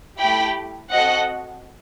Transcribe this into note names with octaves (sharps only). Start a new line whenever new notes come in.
A3 E4 G4 G5 B5
C4 F#4 A4 D#5 F#5